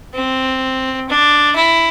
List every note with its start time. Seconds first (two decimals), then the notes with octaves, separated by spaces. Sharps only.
0.14 C4
1.09 D4
1.56 E4